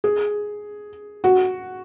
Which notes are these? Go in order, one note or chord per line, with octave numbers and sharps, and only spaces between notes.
G#4
F#4